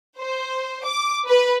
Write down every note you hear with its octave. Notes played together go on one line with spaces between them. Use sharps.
C5
D6
B4